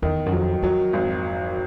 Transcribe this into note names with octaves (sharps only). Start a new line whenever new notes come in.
E2 D#3
F#2
F2 F#3
F2 F#3
G#1